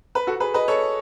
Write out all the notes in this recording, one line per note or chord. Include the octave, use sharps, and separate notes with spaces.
B4
F#4 A4
G#4 B4
B4 D#5
A4 C#5